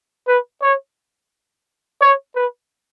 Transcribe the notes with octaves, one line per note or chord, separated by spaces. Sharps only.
B4
C#5
C#5
B4